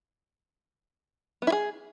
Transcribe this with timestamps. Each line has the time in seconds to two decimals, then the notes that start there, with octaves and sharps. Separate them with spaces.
1.42 B3
1.47 E4
1.52 G#4